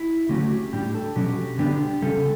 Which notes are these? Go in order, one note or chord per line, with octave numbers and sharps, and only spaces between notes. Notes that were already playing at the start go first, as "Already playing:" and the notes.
Already playing: E4
D3 F#3 A3 C#4 G4
A2 G3 D4 G4
A4
B2 F#3 C#4 G4
D3 G3 B3 D4 G4
C#3 G3 C#4 A4